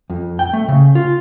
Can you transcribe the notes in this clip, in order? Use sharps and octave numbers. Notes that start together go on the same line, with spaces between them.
F2
G5
A3
C#3
F4